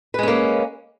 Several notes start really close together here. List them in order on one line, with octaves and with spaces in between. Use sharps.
B4 G#3 C#4 A#3